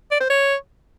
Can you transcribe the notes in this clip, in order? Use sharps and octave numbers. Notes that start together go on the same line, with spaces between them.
D5
C5
C#5